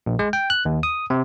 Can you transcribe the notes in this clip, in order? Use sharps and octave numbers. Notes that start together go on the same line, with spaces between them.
A#1
G#3
G5
F#6
D#2
D#6
C3